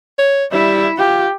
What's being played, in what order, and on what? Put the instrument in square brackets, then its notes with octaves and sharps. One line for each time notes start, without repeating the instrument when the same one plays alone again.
[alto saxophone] C#5
[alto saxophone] G3 [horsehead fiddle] E4 E5
[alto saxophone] F4 [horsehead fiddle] G4